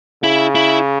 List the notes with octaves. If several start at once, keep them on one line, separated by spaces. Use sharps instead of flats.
C#3 E4
E4